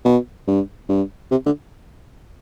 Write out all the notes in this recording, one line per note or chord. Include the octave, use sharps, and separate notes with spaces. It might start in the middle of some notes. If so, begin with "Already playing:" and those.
B2
G2
G2
C3
D3